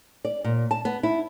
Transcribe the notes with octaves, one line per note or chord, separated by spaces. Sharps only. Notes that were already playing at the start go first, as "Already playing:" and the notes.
D5
A#2
A5
B3
E4